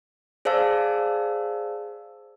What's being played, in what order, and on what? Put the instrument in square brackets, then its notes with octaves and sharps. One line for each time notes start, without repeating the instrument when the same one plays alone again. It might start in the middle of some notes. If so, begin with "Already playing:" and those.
[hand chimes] G#4 C5 D5 F5 A5 E6